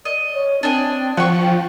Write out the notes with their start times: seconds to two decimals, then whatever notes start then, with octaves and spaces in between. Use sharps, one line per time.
0.05 D5 D#5
0.33 C#5
0.63 C4 D4 D#5 G#5
1.17 F3 F#5 G5 C#6